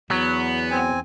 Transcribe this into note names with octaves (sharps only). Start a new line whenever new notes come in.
E2 F#3 B3
C4 G#5